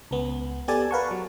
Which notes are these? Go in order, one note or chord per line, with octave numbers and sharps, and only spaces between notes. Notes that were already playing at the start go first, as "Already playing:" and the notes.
C#2 B3
B3 G4 A4 D5 G#5 A5
A#4 B4 F5 F#5 A5 C#6
F#3